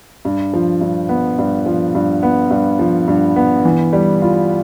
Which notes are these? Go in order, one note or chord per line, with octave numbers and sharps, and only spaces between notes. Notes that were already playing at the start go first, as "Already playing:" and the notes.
G2
F3
G2
B3
G2
F3
G2
B3
G2
F3
G2
B3
E3
G3
F4